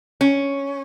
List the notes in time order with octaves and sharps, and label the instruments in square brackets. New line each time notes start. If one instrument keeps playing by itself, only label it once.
[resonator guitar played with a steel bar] C#4